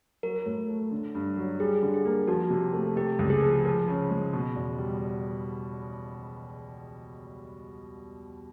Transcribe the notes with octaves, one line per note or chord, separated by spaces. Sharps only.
F#3 A#4
A2
A3
D3
G2
F#3
G3 G#4
D3
G#4
A#3
F3 F#4
C3
A3
C3 G4
C#2
G#4
F3
F3
C#3
G#3
B2
E2
G3